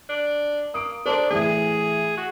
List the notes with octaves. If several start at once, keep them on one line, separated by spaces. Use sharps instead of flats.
D4
A#3 D#6 D7
D4 A4 A#4 C5
A2 E3 G#4
F#4